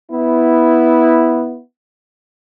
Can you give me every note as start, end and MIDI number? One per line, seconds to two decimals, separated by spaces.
0.12 1.60 59
0.12 1.60 64